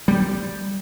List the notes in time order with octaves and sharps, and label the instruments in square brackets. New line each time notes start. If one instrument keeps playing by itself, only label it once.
[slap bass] G3